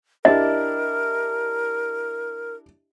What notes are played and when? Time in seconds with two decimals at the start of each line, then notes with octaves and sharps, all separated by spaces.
0.25 D4 E4 G4 A#4 D#5